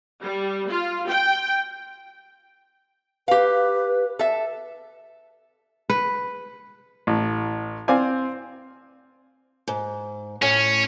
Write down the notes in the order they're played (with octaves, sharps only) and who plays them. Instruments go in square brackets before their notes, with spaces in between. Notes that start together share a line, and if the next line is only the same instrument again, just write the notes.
[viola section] G3
F4
G5
[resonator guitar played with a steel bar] G4 F5 [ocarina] B4
[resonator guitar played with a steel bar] A4 E5
[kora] B4
[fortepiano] A1
C4 C5 D5 F5 G#5
[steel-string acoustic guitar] G#2
[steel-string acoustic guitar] A2 [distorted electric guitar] C#4